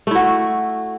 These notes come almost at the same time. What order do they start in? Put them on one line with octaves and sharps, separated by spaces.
A3 E4 F#4